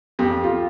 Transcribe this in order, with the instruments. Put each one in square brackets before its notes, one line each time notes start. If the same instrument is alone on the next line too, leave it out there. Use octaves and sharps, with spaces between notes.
[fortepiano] F2 [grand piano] G4
[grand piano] F4